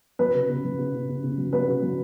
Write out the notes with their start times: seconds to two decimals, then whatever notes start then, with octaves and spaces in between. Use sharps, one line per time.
0.19 F#3 B4
0.34 C#3
0.49 C#3
0.64 F#3
0.79 C#3
0.93 C#3
1.08 C#3
1.23 C#3
1.38 F#3
1.53 F#3 B4
1.67 C#3
1.83 F#3